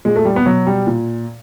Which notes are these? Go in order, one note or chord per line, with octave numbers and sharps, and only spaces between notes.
A#2 G#3
A3
G3
B3
B2 F#3
G3
A#2